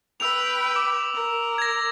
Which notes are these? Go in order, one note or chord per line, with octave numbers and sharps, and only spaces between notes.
B4 G5 E6 F7
D6
A#4
G#6 A#6